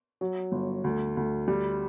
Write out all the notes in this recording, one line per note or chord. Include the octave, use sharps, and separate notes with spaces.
F#3
G1
D2
D2
G3